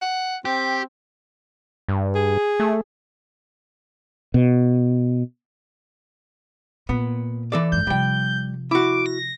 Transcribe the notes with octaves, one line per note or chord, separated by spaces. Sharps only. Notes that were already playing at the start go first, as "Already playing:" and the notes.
F#5
C4 G4
G2
G#4
A3
B2
A#2 B3
E3 A4 D5
F#1 G#2 G6
C3 F3 G3 G5
E4 F#4 D6
A#6